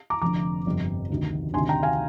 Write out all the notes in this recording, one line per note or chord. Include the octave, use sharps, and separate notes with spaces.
A#5 D6
F1 F2 D3 A#5 D6
G1 F2 C3
D2 C3 D#3
D2 C3 D#3 G#5 C6
G5 A#5
F5 G#5